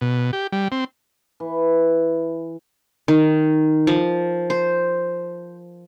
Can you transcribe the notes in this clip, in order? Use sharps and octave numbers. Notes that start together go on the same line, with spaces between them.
B2
G4
G3
C4
E3
D#3
F3
C5